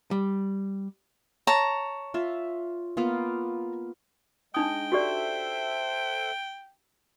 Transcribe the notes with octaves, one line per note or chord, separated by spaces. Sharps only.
G3
C#5 A5 A#5
F4 E5
A#3 B3 F4
G#3 D4 D#4 D#5 G5 D#6
F#4 G4 A4 C5 D5 E5